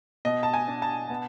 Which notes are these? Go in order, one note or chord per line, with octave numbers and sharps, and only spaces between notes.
B2 D#5
A5
G#5
D4
A5
B3